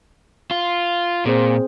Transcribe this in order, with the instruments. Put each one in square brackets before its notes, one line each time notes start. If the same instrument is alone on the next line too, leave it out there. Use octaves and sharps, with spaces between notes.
[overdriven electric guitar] F4
[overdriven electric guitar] A#2 [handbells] C4 G#4 C5